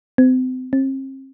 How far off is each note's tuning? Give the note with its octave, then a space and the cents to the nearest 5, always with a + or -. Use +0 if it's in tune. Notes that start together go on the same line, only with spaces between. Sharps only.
C4 -35
C4 +40